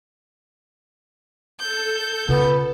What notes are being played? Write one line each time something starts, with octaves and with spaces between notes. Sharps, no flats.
A4 G6
C#3 B3 F4